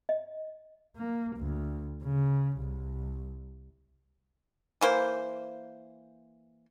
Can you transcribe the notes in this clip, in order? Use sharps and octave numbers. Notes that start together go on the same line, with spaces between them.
D#5
A#3
D2
C#3
C2
E3 A#3 C5